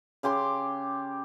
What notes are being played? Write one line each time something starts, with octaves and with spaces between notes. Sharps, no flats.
C#3 G4 C6 D6